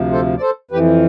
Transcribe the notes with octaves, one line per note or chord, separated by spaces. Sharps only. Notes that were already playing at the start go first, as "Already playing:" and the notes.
Already playing: D2 C3 F3
A4 C5
D5
A4 C5
F2 E3 G4 B4